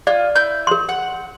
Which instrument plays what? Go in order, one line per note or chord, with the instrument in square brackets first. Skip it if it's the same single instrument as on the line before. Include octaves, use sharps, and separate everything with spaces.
[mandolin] F4 [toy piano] D5
[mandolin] E4 G6
[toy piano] A#4 C6
[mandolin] F#5